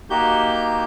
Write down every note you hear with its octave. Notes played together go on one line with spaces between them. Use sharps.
A#3 D#4 F#4 G4 G6